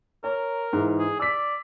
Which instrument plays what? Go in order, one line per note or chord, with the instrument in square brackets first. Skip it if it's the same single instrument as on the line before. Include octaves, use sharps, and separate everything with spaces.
[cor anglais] A#4 [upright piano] C#5
[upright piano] G#2 E3
[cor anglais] G#4
[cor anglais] D5 [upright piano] E6 B6